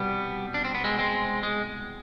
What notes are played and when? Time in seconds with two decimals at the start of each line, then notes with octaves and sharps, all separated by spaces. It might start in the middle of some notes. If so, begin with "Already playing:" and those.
Already playing: C2 B2 G3 B3
0.54 D4
0.65 C4
0.74 B3
0.84 G#3 C4
0.98 G#3 C4
1.43 G#3